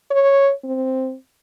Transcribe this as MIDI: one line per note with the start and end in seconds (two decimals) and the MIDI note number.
0.11 0.52 73
0.64 1.15 60